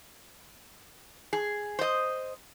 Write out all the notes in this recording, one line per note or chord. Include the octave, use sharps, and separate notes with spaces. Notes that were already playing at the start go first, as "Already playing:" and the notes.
G#4
C5 D#5